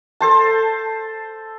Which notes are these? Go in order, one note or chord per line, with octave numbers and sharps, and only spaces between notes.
A4 C5 A5